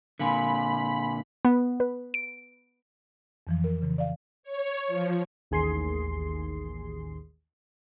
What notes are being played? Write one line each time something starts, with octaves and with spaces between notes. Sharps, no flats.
A#2 D3 F5 G#5 B5 C6
B3
B4
D7
F2 E3 F3
A#4
C#3 E3
D5 F5
C#5
F3
A1 D#2 G#4 C6 C7